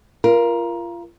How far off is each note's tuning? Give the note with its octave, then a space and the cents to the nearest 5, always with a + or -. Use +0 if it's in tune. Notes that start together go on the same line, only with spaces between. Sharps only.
F4 -25 A#4 +20